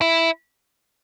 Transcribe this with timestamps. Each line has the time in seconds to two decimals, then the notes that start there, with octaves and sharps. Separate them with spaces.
0.01 E4